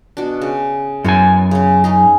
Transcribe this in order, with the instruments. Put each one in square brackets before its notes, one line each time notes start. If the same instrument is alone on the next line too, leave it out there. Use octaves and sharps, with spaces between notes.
[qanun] B2 D4
C#3
[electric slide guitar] F#2 G#5 [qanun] B3 C#4 E4
[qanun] C#3 C#4
C#4 D#4 G#4